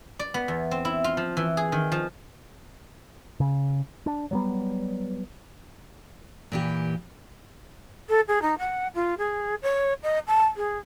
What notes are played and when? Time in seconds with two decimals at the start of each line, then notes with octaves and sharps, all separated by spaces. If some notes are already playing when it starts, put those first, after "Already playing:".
0.19 D5
0.34 B3
0.48 E2
0.71 C4
0.85 E4
1.04 F4
1.17 F3
1.37 E3
1.57 G#4
1.72 D#3
1.92 F3
3.40 C#3
4.06 D4
4.31 F#3 G3 B3
6.52 A#2 E3 G4
8.09 A4
8.28 G#4
8.42 D#4
8.58 F#5
8.95 F4
9.18 G#4
9.62 C#5
10.03 D#5
10.27 A5
10.56 G#4